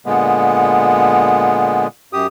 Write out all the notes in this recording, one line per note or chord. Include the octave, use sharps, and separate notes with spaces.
A#2 D3 G#3 B3
F#2 G4 D#6